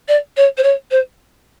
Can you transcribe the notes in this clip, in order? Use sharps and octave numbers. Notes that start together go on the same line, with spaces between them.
D5
C#5
C5
C#5
C5